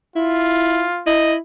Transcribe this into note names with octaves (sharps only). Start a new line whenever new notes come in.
E4 F4
E4 D#5